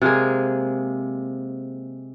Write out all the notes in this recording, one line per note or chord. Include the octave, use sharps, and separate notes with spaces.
C3 G#3 A#3 G#4